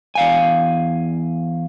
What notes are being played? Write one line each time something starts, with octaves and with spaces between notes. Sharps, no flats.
E2 F5 G#5